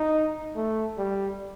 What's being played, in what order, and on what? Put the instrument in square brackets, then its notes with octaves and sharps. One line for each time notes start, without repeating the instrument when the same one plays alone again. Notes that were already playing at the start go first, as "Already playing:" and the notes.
Already playing: [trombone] D#4
A3
G3